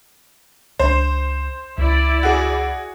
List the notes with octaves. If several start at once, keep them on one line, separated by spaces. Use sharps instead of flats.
C#2 D4 C5
C#2 E4 D5
F#4 G#4